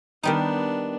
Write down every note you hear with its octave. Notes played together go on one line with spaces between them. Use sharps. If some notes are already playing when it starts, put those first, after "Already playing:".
D#3 G3 B3 D4 D#4